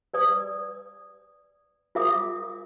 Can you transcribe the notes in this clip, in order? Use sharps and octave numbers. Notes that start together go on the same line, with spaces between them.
B4 D5 D#6
F4 A#4 E5 D6 D#6